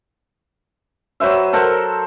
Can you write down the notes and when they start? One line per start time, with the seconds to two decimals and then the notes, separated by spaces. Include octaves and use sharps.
1.20 F#3 B4 C5 E5
1.53 A4 A#4 C5 F#5